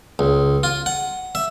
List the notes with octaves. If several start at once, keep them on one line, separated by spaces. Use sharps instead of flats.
C#2
F4
F#5
E5